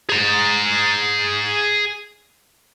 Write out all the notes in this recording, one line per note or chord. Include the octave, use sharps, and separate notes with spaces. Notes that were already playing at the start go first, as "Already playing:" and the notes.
G#4 A#5